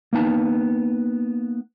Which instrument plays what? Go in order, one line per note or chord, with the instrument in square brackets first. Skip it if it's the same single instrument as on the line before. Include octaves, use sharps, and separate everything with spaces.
[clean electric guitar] A#3 B3 D#4 A5